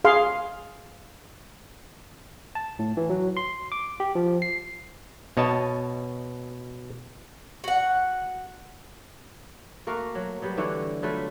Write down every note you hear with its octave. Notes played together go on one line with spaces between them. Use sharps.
G#4 F5 C6
A5
A2
E3
F#3
C6
D6
G4
F3
C7
B2 C#5 D#5 A5
F#4 F#5
A3 A#3 F#4 A#4
F#3
F#3 G3 B3
D3 E3 D4 C#5
F#3 A3 F4 B4